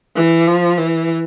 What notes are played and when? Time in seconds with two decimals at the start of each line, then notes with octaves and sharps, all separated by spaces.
0.16 E3
0.47 F3
0.78 E3